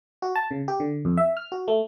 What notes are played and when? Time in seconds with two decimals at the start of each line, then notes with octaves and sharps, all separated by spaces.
0.22 F#4
0.35 A5
0.51 C#3
0.68 G4
0.80 D3
1.05 F2
1.17 E5
1.37 F6
1.52 F#4
1.68 A3